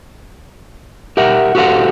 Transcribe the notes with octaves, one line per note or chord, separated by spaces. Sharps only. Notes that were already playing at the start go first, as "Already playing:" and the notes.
G4 A#4 E5 F#5
F#4 G4 A4 C5 F5 F#5